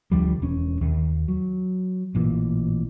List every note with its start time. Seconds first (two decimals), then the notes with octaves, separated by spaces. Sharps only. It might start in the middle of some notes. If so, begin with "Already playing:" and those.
0.11 F1 D2 F3 G3
0.42 E1 C#4
0.81 D#2
1.28 F#3
2.15 A1 A#2 E3